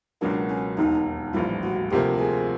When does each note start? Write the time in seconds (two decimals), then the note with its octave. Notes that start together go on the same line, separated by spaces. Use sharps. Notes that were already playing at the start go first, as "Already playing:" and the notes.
0.21 C#2 B2 F#3 A#3 D4
0.50 C#4
0.77 E1 D#2 D#3 D#4
1.34 A#1 A2 E3 G3 F4
1.63 F#4
1.91 D2 C3 F3 A#3 G4
2.18 G#4